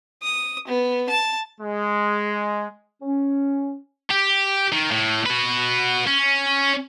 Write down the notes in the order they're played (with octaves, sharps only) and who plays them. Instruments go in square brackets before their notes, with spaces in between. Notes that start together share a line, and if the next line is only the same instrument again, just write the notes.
[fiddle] D#6
B3
A5
[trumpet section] G#3
[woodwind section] C#4
[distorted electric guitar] G4
D#3
A2
F#4 B4
C#4